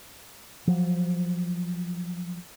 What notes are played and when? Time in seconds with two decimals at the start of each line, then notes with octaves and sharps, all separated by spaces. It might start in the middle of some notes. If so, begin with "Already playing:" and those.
0.67 F3 F#3